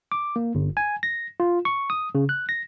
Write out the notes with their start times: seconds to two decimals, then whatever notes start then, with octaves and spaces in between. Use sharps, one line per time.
0.12 D6
0.36 A#3
0.55 G1
0.77 G#5
1.03 A#6
1.40 F4
1.65 C#6
1.90 D#6
2.15 C#3
2.29 F#6
2.49 A#6